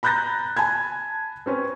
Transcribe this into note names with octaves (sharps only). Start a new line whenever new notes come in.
A#5 B5 F#6 G6 A6 A#6
G#5 A5 B5 G#6
C4 C#4 B4